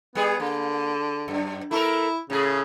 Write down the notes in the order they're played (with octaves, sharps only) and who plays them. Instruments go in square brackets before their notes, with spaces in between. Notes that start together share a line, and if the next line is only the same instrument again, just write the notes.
[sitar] G3 G#4 [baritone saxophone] B3
[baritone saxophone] D3 [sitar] A#3
[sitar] F#2
[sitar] A3 A4 A#4 [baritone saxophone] E4
[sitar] A2 G#4 [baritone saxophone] C#3